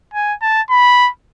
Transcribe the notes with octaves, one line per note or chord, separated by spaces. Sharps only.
G#5
A5
B5